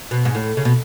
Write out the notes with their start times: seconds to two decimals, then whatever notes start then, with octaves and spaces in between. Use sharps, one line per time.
0.11 B2
0.25 G#2
0.35 A2
0.57 C#3
0.65 B2